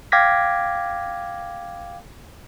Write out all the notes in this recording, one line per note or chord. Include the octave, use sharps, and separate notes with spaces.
F5 G5 D6 G#6 A#6 B6